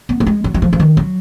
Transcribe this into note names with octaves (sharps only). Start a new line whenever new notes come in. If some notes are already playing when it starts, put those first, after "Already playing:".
B3
A#3
G#3
F#3
F#3
F3
F3
D#3
F#3